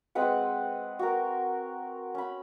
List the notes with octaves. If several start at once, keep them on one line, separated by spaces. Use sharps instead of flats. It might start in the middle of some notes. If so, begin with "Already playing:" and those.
G#3 C4 B4 F#5
F#4 A#4
C#4 B5